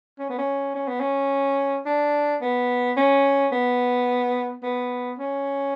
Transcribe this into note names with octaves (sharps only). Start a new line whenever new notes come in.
C#4
B3
C#4
C#4
B3
C#4
D4
B3
C#4
B3
B3
C#4